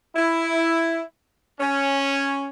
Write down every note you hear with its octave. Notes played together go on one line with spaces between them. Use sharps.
E4
C#4